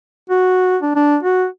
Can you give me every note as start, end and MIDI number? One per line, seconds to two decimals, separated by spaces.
0.30 0.77 66
0.82 0.94 62
0.95 1.17 62
1.23 1.46 66